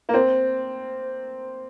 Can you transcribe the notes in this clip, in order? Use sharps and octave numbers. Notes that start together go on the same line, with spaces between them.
A#3
C4